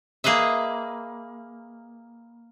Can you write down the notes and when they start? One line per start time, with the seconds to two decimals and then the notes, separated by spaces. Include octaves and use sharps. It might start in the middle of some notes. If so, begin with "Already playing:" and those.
0.24 A#3 G#4 B4 D#5 E5